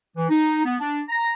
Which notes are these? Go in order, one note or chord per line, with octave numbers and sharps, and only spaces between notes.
E3
D#4
B3
D4
A#5